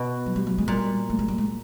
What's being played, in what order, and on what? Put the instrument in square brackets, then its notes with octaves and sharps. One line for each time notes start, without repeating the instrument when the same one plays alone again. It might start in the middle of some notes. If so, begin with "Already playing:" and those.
Already playing: [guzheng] B2
[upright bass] F#3
G3
F#3
G#3
[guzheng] A#2 [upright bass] G3
[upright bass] A3
G#3
G3
G#3